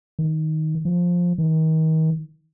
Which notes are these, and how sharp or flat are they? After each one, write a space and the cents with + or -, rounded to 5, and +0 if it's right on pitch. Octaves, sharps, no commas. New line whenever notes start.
D#3 +10
F3 +10
D#3 +35